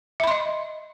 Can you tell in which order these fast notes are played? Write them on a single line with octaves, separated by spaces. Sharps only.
E5 B5 C6 D#5